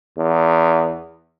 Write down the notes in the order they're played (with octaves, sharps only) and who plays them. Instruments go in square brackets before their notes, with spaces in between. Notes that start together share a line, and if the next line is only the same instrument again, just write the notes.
[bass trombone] E2